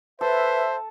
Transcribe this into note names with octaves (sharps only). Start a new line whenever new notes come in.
A4 B4 C5 E5